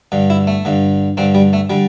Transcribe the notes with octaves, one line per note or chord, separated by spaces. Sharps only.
G2 D3
E4
A3
G2 D3
G2 D3 C4
G3
A3
D3 G3